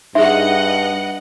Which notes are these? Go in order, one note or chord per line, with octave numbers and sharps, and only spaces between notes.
G2 D#4 G#4 D#5 E5 F#5